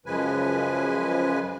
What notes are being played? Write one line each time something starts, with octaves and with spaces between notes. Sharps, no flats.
F#2 C#3 F3 G#3 B4 G#5